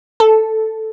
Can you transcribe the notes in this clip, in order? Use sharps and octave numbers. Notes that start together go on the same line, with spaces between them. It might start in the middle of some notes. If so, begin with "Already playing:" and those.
A4